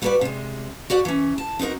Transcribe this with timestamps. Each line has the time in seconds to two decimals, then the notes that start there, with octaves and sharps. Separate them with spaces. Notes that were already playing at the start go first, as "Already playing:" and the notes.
0.02 G3 F#4 G4 A4 B4 D5
0.21 C3 G#3
0.90 F#4 G4 D5 F#5
1.05 E3 C#4
1.38 A5
1.59 C4 D#4 F#4 A#4